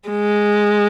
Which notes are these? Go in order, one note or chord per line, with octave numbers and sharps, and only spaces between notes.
G#3